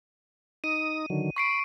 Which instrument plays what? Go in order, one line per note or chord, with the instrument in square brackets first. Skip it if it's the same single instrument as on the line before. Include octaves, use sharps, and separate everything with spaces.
[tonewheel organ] D#4 D#6 [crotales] D#7
[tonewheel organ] D3 D#3 F#3
[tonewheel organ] B5 [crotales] C#6 C7 D7